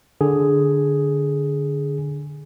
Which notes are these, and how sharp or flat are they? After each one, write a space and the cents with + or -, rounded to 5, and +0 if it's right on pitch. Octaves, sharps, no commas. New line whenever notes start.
D3 +0 G#4 +5